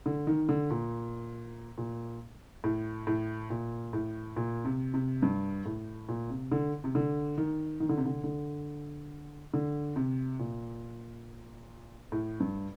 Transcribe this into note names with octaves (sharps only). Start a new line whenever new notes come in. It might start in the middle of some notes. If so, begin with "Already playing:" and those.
D3
D#3
D3
A#2
A#2
A2
A2
A#2
A2
A#2
C3
C3
G2
A2
A#2
C3
D3
C3
D3
D#3
D#3
D3
C3
D3
D3
D3
C3
A#2
A2
G2